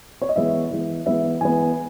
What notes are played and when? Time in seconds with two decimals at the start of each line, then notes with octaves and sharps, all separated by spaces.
0.22 C#5
0.29 D#5
0.36 E3 G#3 B3 E5
0.71 E3 G#3 B3
1.06 E3 G#3 B3 E5
1.41 E3 G#3 B3 G#5